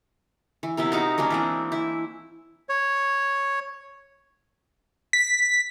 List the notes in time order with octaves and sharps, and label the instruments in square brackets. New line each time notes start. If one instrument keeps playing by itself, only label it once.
[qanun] E3
C3 B3 E4 A#4
D#4 F#4 F5 A#5
F#3 A#3 C#4 D4
E3 G#3 C4
E4
[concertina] C#5
[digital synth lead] B6